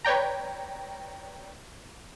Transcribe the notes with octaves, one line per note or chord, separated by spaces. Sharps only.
B4 C#5 D5 G5 A#5